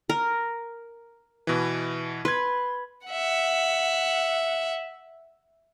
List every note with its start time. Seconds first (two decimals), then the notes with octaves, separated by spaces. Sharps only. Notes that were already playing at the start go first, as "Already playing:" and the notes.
0.09 A#4
1.47 B2 E3
2.25 B4 C6 G#6
3.06 E5 F#5